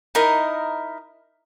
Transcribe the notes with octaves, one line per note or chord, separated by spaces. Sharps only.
D#4 E4 A#4 D#5